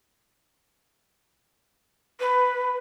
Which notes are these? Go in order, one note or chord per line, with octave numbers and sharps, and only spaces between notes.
B4